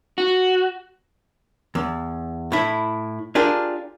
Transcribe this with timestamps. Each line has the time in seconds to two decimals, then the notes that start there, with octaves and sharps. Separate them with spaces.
0.18 F#4
1.75 E2
2.52 A2 E4
3.35 D4 F4 G4 G#4 A#4